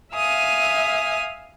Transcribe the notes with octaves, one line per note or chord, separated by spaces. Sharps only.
E5 F5 G#5 D#6